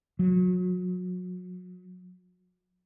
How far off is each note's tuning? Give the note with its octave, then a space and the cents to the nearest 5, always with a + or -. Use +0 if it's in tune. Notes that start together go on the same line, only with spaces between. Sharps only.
F#3 -30